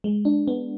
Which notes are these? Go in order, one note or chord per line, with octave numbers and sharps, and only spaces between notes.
G#3
D4
B3